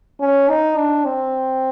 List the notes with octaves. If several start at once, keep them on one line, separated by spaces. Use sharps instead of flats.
C#4
D#4
D4
C4